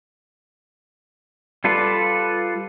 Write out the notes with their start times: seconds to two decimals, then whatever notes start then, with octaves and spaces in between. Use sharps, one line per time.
1.64 G3 F4 A4 B4 D5